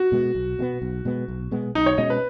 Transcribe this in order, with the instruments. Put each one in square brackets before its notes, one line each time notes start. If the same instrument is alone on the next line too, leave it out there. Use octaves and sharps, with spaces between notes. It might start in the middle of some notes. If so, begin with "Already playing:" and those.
Already playing: [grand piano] F#4
[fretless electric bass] B2 G#3 B3
B1
B2 G#3 B3
B1
B2 G#3 B3
B1
B2 G#3 B3
[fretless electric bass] B1 [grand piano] D#4
[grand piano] C#5
[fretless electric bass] B2 G#3 C#4 [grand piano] D#5
[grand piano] B4